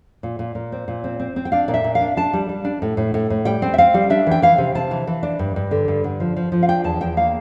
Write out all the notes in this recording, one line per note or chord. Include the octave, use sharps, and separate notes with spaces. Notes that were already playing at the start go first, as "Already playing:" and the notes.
A#2
A#2
A#2
C4
A#2
C4
C4
C4
G5
D4 F5
A#2 D5
E5
A#2
F5
D4
D4 A5
G3
G3
D4
A2
A2
A2
A2
G3 G5
C4
E5
C4 F5
G3
D4 E5
E3 G5
E3 F5
C3
C3 A5
E3
E3
D4
G2
G2
D3
G2
D3
F3
F3
F3
F5
D4 G5
E2 A5
E2 G5
A#3 F5